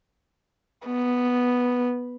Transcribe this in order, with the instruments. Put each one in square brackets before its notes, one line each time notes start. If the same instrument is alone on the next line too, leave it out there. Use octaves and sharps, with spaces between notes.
[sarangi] B3